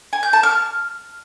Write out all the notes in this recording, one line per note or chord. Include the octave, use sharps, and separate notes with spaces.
G#5
G6
A5
F6